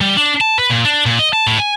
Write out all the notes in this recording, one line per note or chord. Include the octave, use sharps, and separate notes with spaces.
G3
D4
A5
B4
A#2
D4
A#2
D#5
A5
A2
G#5